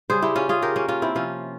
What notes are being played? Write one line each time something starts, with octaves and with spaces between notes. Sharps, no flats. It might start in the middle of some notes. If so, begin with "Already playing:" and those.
C#3 G3 G#4 C5
E4 G4
C#4 F4
F4 G#4
G4 A#4
A#3 C#4
C#4 F4
C4 E4
C3 F3 C#4 F4